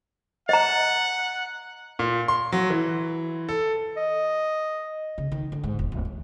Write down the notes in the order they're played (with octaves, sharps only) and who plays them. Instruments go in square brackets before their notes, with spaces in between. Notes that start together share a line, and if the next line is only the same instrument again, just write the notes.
[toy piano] D#5 A#5 [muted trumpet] F#5
[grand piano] A#2
C6
F#3
E3
A4
[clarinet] D#5
[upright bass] C#3
D#3
D3
G#2
E1
D1
E3